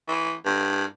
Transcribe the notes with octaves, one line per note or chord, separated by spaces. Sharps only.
E3
G2